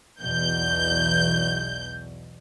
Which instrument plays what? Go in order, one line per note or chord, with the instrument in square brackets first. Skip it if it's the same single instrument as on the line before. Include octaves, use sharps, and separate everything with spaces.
[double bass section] B1 E2 B2 [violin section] G6